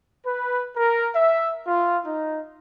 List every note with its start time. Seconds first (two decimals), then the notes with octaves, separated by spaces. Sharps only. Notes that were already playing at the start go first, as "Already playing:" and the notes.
0.25 B4
0.76 A#4
1.14 E5
1.67 F4
2.06 D#4